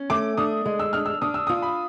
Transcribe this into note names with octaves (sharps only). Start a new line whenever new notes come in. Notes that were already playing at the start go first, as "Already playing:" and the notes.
Already playing: C#4
A3 D6
D4 D#6
G#3
E6
D4 F6
E6
D4 D#6
E6
F4 D#6
B5